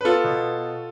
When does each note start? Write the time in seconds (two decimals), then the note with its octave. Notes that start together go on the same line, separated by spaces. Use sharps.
0.01 B4
0.05 B3 F4 A4
0.24 B2